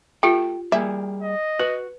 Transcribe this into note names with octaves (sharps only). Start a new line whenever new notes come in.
A3 F4 G4 G5
G3 A#3 G#4 E5
D#5
F#4 B4